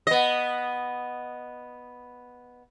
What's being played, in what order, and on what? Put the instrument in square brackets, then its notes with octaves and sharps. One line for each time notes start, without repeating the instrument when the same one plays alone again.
[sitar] B3 D#5